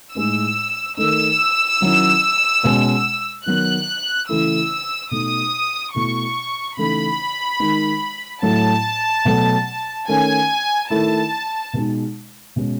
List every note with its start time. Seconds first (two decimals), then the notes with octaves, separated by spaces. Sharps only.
0.15 A2 G#3 D#4 E6
0.97 D#3 A3 D#4 E6
1.80 D#3 F#3 C#4 E4
2.63 B2 G#3 C#4
3.46 D#3 F#3 B3 F#6
4.29 C#3 E3 A3 E4 E6
5.11 B2 A3 D#4 D#6
5.94 B2 A3 E4 C#6
6.77 C#3 E3 A3 D#4 B5
7.60 D#3 G#3 D#4
8.42 A2 F#3 A3 E4 A5
9.25 B2 F#3 A3
10.08 D#3 A3 C#4 G#5
10.90 D#3 A3 E4 A5
11.73 B2 G#3 D#4
12.56 B2 G#3 C#4